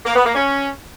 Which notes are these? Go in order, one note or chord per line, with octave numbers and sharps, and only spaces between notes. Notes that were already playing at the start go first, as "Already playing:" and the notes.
A#3
B3
A#3
C#4